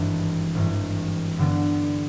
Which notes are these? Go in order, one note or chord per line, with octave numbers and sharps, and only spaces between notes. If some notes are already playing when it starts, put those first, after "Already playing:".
Already playing: G#1 G2 E3
G#1 G2 E3
G2 D3 G3 B3